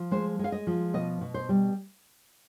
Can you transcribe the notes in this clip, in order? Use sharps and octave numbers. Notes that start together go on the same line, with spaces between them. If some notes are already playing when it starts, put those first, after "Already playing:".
Already playing: F3
G#3 C5
G#3
F5
D#5
F3
B2 D#5
B2
C5
G3